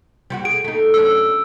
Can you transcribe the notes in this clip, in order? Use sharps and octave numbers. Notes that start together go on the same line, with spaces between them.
G3 F4 F#4
G#4 D7
A3 D#4
F#2 C#4 D4 E6